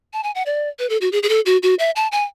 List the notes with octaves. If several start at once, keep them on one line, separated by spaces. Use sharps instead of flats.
A5
G#5
F#5
D5
B4
A4
F#4
G#4
G#4
A4
F#4
F#4
E5
A5
G#5